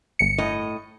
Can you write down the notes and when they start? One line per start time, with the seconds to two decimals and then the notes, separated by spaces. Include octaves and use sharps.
0.19 G1 C#7
0.38 A2 D#5